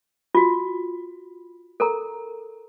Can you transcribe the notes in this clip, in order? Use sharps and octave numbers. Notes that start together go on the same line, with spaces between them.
F4 F#4
A4 A#4 A#5